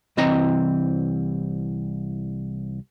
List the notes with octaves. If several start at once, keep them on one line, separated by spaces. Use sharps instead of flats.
C2 E3 C4 D#5 A#5